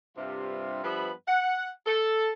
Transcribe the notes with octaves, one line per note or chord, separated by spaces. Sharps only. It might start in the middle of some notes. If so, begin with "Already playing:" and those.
G2 C3 F4
G2 F3 B3 B4 E5 B5
F#5
A4